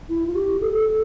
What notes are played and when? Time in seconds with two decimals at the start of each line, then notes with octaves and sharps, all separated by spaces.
0.09 E4
0.27 F4
0.35 G4
0.61 A4
0.78 A4